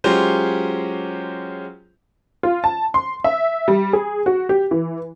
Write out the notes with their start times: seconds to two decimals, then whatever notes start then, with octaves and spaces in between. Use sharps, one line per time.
0.04 F#3 G#3 C#4 F4 G4 C5
2.43 F4
2.64 A5
2.94 C6
3.24 E5
3.68 G3
3.93 G#4
4.26 F#4
4.49 G4
4.71 E3